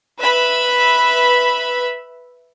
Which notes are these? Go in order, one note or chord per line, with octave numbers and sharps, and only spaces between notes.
B4 E5 B5